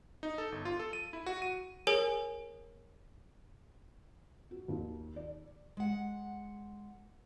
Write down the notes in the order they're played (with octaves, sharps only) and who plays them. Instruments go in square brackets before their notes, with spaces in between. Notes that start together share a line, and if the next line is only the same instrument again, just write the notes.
[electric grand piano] D#4
A4
G1
F4
A4
D#7
E4
F#4
D#7
[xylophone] G#4 A#4 C#5 G#5
[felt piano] F#4
D#2
D5
[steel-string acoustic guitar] G#3 F#5